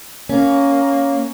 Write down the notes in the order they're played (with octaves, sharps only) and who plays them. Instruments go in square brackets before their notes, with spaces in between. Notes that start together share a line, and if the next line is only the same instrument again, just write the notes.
[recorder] A#3 [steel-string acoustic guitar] C#4